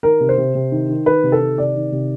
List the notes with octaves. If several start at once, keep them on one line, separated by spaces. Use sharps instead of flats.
D#3 A#4
C3
C5
C3
C3
D#3
D#3
D#3 B4
C3
A4
D#3
C3 D5
D#3
C3